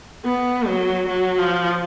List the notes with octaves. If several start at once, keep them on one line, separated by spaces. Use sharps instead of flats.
B3
F#3
F#3
F3